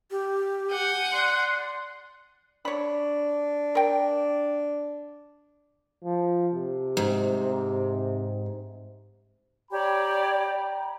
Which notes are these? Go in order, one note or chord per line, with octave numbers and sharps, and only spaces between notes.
G4
F#5 G#5 G6
D5 C6 F#6
D4 C#5 B5
A#4 G5
F3
C3
G#2
G4 C#5 D5 G5 A#5 B5